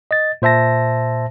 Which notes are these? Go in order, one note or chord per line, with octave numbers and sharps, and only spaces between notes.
D#5 A6
A#2 C5 E5 A5 A#6